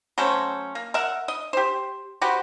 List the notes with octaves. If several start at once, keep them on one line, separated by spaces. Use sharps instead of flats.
F#3 A3 C#4 C5
A#3
A#4 E5 F#5
D#5
G4 C5
F#4 G4 B4 C5